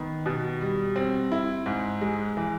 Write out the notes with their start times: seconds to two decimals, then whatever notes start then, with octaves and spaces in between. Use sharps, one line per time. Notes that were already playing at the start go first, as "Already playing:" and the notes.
Already playing: D#3 B3
0.26 B2
0.61 G3
0.96 C4
1.32 E4
1.66 G#2
2.01 G#3
2.37 E3